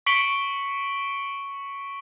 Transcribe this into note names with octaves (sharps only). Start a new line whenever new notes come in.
C#6 B6 C#7 D7 F#7 G7